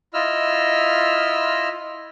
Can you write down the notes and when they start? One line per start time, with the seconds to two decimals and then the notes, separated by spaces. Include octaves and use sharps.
0.14 E4 F4 D#5 E6 F6